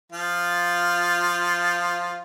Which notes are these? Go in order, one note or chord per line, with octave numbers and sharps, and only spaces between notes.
F3 F4